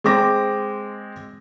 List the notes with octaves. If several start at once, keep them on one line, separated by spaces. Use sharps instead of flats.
G#3 C4 D6 A#6